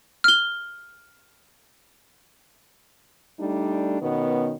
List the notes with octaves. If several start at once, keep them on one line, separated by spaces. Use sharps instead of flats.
F6 G7
G3 A3 D4 D#4
B2 D#3 B3 C#4